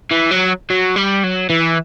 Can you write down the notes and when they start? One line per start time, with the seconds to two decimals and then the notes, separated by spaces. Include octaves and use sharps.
0.11 E3
0.31 F#3
0.70 F#3
0.96 G3
1.23 F#3
1.50 E3